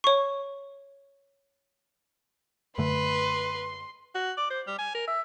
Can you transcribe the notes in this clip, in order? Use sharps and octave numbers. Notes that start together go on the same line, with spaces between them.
C#5 C#6
F#2 D3 A3 B4 C6
F#4
D5
C5
G3
G#5
A#4
E5